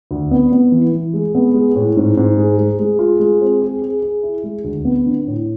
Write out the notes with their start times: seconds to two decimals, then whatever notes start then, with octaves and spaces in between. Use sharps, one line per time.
0.11 D2
0.31 B3
0.52 B3
0.72 E3
0.93 E3
1.14 G#3
1.35 B3
1.54 G#3
1.75 A2
1.97 G#2
2.17 G#2
2.37 G#3
2.58 G#3
2.79 G#3
2.99 F4
3.20 G#3
3.41 C4
3.61 G#4
3.82 G#4
4.02 G#4
4.23 E4
4.43 G#3
4.64 D2
4.85 B3
5.06 D3
5.27 A2